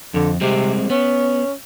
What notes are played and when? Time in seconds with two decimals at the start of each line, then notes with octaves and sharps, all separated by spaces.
0.14 F2 D3
0.41 C3 G3 G#3 C4
0.90 B3 C#4